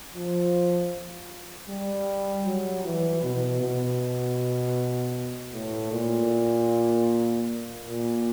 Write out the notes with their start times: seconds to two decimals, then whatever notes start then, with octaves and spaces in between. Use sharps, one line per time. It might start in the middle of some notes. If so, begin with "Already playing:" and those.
0.14 F3
1.68 G3
2.45 F#3
2.84 E3
3.23 B2
3.61 B2
5.53 A2
5.92 A#2
7.85 A#2